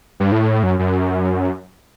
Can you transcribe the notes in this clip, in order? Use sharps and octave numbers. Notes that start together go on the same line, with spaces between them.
G2
A2
F#2
F#2